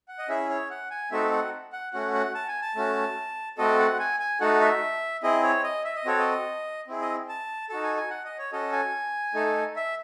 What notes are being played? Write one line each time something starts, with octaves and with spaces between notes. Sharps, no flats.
F#5
D#5
C#4 E4 G#4 E5
C#5
F#5
G#5
A3 C4 D#4 F#4 A4 E5
F#5
F#5
A3 C#4 F#4 F#5
F#5
A5
G#5
A5
A3 C#4 F#4
A3 C4 F#4 A4 D#5
F#5
G#5
G#5
A3 D#4 F#4 A4 F#5
E5
C4 E4 G#4 D#5
C#5
D#5
E5
D#5
C4 F#4 A4 C#5
D#5
C4 E4 G#4
D#5
A5
D#4 F#4 A4 A5
G#5
G#5
F#5
D#5
C#5
C#4 F#4 A4 D#5
G#5
A3 D#4 A4
E5